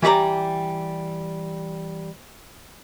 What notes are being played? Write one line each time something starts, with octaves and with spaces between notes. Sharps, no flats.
E3 G3 G4 D5 A#5